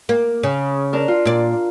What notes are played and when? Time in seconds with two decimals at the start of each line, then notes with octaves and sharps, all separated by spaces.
0.09 A#3
0.43 C#3
0.93 D4 A#4
1.08 F4
1.25 A#2 D5